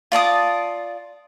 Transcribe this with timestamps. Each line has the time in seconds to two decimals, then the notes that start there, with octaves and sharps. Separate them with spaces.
0.12 F4 D5 A5 D#6